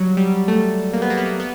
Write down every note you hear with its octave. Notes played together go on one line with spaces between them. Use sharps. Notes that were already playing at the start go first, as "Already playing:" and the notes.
Already playing: F#3 G3
G3
A3
A#3
B3
A#3
B3
A#3
B3